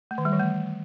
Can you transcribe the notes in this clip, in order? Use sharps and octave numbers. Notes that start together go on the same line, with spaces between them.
A3
D#3
G3
E3
A3